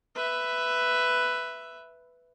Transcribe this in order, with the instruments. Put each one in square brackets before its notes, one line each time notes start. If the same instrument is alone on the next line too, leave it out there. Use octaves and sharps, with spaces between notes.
[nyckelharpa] B4 E5